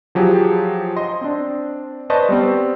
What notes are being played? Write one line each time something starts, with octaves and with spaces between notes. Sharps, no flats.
F3 F#3 G4 G#4
D#5 C6
C4 D4
B4 C5 D5 D#5 A5 C#6
G3 B3 C4